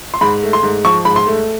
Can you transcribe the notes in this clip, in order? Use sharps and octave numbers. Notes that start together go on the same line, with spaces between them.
C6
G#2 B5
A3
C6
G#2
F3 C#6
G#2 B5
C6
A3